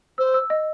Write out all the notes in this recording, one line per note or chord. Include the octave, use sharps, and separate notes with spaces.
C5 E6
E6
D#5